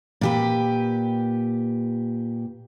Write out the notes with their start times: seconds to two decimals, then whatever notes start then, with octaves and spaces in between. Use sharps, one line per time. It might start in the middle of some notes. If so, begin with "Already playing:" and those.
0.21 A#2 G4 B4